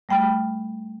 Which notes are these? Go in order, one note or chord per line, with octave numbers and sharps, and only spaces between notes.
G3 A3 G5 B5 F6